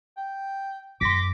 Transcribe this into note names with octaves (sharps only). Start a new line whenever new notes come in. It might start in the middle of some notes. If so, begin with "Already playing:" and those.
G5
F#2 C6 D6 A#6 B6